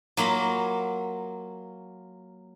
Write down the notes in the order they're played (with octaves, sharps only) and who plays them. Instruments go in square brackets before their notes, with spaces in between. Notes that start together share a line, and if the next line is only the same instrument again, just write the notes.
[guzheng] F#3 A#3 F4 B5